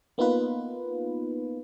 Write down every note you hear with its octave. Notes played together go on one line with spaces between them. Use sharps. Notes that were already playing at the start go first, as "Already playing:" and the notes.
A#3 B3 D#4 F4 B4